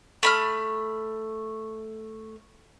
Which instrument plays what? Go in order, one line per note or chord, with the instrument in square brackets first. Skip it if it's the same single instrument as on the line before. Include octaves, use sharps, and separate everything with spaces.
[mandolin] A3 B5 F6